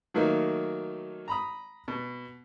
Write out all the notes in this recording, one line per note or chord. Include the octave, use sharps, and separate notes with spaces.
D#3 F#3 A3 A#3 D#4
A#5 B5 D#6
B2